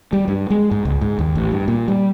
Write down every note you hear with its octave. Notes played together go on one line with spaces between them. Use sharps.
G3
G2
G#3
G#2
C#2
G#2
D#2
A1
G2
A#2
G3